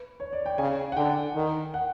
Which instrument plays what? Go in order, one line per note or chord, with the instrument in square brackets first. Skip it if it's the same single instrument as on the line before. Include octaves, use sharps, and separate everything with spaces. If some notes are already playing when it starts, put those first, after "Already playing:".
Already playing: [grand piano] B4
C#5
D5
G5
[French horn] C#3 [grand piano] G#5
[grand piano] F#5
[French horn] D3 [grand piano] G5
[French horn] D#3
[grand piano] F#5